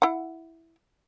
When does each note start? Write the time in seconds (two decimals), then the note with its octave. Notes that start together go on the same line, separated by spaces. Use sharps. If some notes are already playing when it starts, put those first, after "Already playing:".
0.02 E4 F#5